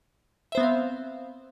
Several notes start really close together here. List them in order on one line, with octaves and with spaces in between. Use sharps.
E5 C5 B3 C4 F5